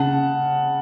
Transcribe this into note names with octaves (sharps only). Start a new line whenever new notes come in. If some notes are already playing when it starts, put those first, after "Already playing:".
Already playing: C#3 F#5 A5